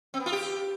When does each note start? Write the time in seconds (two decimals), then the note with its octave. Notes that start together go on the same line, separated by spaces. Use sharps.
0.14 C4
0.20 B3
0.26 F4
0.32 G4